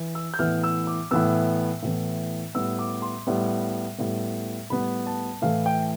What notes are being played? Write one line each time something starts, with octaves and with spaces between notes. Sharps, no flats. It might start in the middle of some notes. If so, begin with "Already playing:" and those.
Already playing: E3
E6
G6
A2 E3 B3 F6
E6
D6
A2 E3 B3 E6
A2 E3 B3
A2 G3 B3 E6
D6
C6
A2 G3 B3
A2 G3 B3
A2 G3 B3 B5
A5
A2 E3 A3 F5
G5